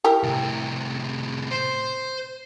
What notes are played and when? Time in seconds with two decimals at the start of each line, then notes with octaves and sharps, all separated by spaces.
0.04 E4 G4 A#4
0.23 A2 C3
1.51 C5